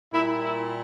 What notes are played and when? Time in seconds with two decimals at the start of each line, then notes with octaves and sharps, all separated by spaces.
0.12 A#2 G3 E4
0.44 E4